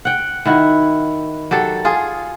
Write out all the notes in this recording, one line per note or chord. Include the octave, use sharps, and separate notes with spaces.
F#5 G5
D#3 E4 F#4
F#3 G4 A4
F4 G#4